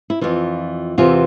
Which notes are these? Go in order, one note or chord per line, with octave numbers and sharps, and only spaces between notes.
E4
F2 E3 F4
E2 C3 E3 F4